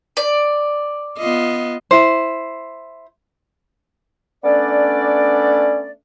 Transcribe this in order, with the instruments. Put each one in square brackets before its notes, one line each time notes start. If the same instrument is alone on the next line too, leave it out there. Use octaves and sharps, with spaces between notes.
[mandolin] D5
[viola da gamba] B3 F4 D#5
[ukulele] E4 C5
[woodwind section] A3 B3 C#4 D4 D5